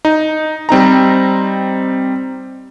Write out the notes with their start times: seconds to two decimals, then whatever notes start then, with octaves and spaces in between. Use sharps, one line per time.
0.05 D#4
0.69 G3 C4 D#4 A#5